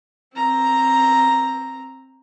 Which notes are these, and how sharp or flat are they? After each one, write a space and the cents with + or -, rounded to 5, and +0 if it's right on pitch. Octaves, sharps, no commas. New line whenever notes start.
C4 +15 A#5 +0